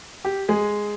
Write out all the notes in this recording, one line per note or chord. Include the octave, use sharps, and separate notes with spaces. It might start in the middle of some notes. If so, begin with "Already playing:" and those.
G4
G#3 G#4